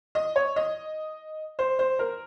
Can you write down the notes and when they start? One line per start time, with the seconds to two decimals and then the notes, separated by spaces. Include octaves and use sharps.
0.15 D#5
0.36 C#5
0.56 D#5
1.59 C5
1.79 C5
1.99 A#4